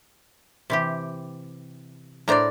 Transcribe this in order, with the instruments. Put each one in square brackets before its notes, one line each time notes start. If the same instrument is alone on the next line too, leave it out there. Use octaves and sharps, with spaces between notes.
[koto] C3 E3 G4
[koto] A2 D4 A#5 [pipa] A#4 C5 D5